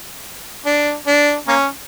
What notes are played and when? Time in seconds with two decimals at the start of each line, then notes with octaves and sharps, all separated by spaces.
0.66 D4
1.07 D4
1.48 A#3 C#4